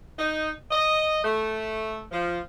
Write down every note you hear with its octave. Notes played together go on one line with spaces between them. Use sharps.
D#4
D#5
A3
F3